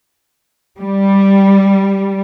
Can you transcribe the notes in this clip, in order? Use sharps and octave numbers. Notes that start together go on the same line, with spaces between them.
G3